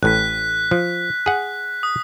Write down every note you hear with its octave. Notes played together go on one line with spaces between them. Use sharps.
A1 A2 F#6 B6
F3
G#4 F#5
D#6